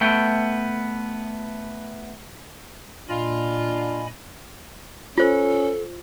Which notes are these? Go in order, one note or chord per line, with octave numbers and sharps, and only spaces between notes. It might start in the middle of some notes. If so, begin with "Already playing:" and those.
A3 B3 G5
A#2 D4 F4 D#5 G#5 B5
C#4 F4 A4 C5